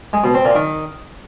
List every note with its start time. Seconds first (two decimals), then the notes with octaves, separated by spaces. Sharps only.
0.13 G#3
0.24 B2
0.34 C4
0.45 A#2
0.55 D#3